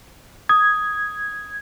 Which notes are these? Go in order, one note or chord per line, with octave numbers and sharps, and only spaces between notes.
D#6 G#6